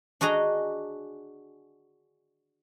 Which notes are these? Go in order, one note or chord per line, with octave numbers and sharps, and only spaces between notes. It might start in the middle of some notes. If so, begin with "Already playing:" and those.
D4 F#4 G#4 D#5 A#5